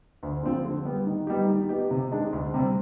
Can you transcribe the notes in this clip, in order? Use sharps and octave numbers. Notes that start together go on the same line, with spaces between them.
D2
D3 F3 C4 F4
D3
G3 B3
D#3
G3 B3 D#4 G4
D#3
B3 D#4 G4
C3
D#3 G#3 D4
D2
C3 G3 C4